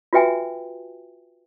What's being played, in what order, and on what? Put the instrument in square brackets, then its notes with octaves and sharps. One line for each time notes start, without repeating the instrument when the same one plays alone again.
[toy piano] F4 F#4 B4 E5 G5 G#5